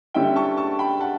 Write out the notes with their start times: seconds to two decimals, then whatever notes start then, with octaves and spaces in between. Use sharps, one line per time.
0.14 D3 G3 C#4 E4 E5 G5
0.36 A5 C#6
0.57 A5 C#6
0.79 G5 B5
1.00 F#5 A5